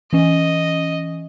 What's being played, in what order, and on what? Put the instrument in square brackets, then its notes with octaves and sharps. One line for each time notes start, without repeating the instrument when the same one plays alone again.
[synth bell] E3 C#4 [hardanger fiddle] D#5